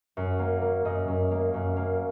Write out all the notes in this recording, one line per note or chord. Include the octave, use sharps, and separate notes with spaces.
F#2
A#3
A#3
F#2 D#5
F#2
A#3
F#2
A#3